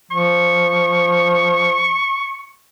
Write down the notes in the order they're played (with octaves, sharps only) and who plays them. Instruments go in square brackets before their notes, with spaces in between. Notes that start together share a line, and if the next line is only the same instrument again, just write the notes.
[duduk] F3 [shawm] C#6